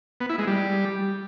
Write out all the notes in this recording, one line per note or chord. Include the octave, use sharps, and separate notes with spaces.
B3
E4
G#3
G3